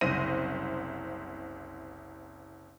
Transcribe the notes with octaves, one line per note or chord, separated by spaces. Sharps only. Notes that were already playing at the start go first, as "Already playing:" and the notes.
F#1 C2 C5 A#6 D#7